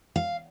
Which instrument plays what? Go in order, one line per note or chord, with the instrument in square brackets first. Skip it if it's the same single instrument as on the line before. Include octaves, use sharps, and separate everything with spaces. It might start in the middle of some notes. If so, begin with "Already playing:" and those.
[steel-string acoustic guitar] F5